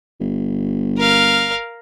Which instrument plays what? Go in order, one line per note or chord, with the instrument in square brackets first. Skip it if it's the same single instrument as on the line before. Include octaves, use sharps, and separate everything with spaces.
[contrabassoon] G1
[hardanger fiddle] A#4 F5